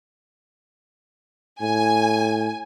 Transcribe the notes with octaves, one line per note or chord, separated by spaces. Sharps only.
A2 G#5